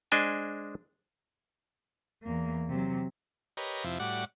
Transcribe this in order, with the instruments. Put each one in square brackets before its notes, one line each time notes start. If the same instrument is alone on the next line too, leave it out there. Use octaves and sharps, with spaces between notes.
[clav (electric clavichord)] G#3 D4 C5 D#5 G#5
[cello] E2 A#3
C3 F#3
[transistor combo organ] G4 A#4 B4 C#5 D#5
F2 C3 F3 E4
A2 G3 F#4 D5 F#5